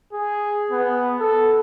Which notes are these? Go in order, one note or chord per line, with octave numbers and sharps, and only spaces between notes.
G#4
B3
A4